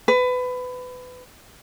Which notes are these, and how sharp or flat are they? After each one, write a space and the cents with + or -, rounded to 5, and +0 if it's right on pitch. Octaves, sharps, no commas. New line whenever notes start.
B4 +25